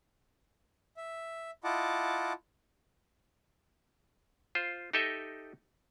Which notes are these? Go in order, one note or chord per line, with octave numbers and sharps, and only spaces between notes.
E5
E4 F4 D#5 F#5 A5 D6
F4 C5
D#4 G4 A4 D#5 E5